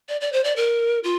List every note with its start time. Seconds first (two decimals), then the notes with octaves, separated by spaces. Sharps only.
0.09 D5
0.21 D5
0.33 C5
0.44 D5
0.56 A#4
1.04 F4